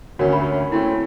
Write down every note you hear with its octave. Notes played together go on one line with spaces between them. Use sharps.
D2 A#3 C#4 F#4 A#4 C#5
E5 B5
A3 C4 C#4 E4